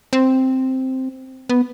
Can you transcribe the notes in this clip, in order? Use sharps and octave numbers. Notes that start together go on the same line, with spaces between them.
C4
B3